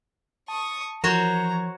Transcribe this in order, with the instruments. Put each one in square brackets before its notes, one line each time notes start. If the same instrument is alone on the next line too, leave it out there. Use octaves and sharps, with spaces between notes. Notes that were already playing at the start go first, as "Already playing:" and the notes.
[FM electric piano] A5 [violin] C#6 D#6
[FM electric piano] E3 F3 A#4 [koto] F#4 C5 C#5 [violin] A#5